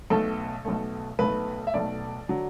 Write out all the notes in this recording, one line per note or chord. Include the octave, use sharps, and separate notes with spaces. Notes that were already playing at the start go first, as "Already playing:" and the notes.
B1 B2 A3 A4
B1 B2 A3
B1 B2 A3 B4
E5
B1 B2 A3 D5
D3 F#3